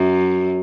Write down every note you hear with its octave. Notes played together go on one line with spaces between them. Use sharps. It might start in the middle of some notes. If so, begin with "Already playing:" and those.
Already playing: F#2